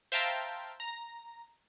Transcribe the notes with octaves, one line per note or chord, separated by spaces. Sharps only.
C5 E5 F5 G5 A5 A#5
A#5 A#6